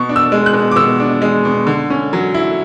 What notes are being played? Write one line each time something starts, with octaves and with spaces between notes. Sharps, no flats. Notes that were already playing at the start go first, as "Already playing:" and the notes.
Already playing: B2 C#6
D4
E6
G#3
F#6
B2
D6
B2 E6
D4
G#3
B2
D3
C#4
F#3
E4